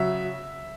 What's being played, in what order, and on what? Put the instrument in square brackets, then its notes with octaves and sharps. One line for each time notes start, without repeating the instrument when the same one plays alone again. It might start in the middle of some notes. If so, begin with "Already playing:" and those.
Already playing: [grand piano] C#3 F#3 E5